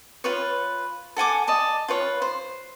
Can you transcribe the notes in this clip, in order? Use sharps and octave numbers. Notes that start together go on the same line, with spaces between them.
F4 B4 C#5
A4 F#5 G#5 D6
D5 D#5 A5
F4 B4 C#5
C5